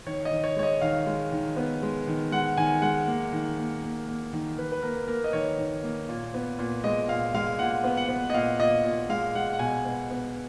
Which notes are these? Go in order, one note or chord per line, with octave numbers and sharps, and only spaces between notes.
D#3 C#5
D#5
D#3
C#5
G#3 C#5
D#5
D#3 F5
G#3
D#3
B3
G#3
D#3
G#3 F#5
D#3 G#5
G#3 F#5
A#3
D#3
A#3
A#3
A#3
D#3
D#3 B4
B4
A#3 A#4
A#3 A#4
D#5
D#3 C#5
D#3
A#3
A#2
B3
A#2
G#3 D#5
A#2 F5
G#3 F5
A#2 F#5
B3
F#5
B3
D#5
A#2 F5
A#2 D#5
A#2
G#3 F5
G#3 F#5
F#5
B2 G#5
B3
B3